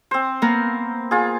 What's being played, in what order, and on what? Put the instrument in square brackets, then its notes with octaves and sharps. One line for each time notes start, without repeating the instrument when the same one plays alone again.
[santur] C4 C5
[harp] A#3 B3 A#4
[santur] F4 G#4